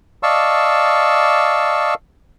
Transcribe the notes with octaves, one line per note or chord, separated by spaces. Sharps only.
D5 D#5 F5 A5 C#6 E6